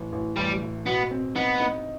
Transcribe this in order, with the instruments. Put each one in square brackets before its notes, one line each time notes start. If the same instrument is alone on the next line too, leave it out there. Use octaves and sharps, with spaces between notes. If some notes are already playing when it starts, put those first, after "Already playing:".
Already playing: [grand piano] A1
A1
[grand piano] A1 [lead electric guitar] G3
[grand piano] A2
[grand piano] B2 [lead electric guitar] B3
[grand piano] C4
[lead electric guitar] B3 [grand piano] D#4
[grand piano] D#4